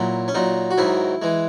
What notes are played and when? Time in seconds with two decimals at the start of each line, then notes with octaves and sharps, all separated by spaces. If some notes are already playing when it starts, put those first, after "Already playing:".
Already playing: A#2 F#3 E4
0.28 C#4
0.35 A#2 F#3 D#4
0.71 F#4
0.78 G#2 D#3 F#3 E4
1.22 E3 G#3